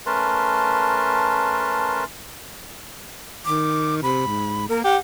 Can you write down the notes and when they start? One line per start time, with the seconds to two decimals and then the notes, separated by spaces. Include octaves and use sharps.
0.06 A3 C#4 A#4 B4 A5 C6
3.45 D#3 D6
4.03 C3 B5
4.26 G#2
4.69 A#3 A#4
4.84 G4 F#5